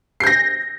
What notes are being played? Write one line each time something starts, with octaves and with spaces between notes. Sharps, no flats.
G6 A#6 C7